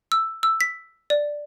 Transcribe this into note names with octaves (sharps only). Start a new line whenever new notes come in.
E6
E6
B6
D5